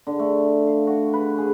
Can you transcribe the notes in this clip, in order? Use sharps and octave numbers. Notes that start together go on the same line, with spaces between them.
D3
A3
F5
F#4
B4
G#4